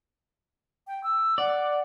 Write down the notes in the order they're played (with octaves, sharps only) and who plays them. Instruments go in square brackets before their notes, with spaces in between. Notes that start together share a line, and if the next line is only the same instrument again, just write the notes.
[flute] G5
E6
[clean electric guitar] D5 [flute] F#5